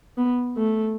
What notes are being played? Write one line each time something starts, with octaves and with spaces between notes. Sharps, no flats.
B3
A3